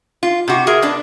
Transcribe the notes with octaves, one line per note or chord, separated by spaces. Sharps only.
F4
C3 F#4
G#4 A#4 E5
B3 D4